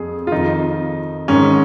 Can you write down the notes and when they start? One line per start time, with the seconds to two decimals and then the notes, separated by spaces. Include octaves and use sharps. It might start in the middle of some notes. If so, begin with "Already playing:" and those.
Already playing: F2 G#4
0.27 F4
0.32 F2 D#3 D#4
1.28 G#2 D#3 C#4